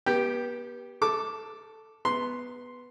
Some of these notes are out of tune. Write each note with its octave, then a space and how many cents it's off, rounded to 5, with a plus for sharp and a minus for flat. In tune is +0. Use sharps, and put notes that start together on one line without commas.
B3 -35 G4 +0 G5 +0
A4 +0 D6 +0
B3 +0 C6 +0